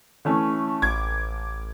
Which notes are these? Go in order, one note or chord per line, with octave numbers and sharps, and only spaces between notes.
E3 A3 C#4
A1 D6 G#6